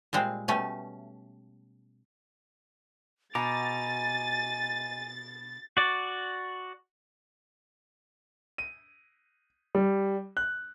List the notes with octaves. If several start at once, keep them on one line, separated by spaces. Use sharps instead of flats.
A#2 G3 G#3 C4
B2 G3 A3 C#4
B2 D#5 G#5 A#5 D6 A6
F#4 D5
D#7
G3
F#6